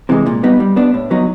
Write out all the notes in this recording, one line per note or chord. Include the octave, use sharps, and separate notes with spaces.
C3 E3 G#3
A#2
G3 B3 D#4
G3
B3 D4
A2
F#3 B3 D#4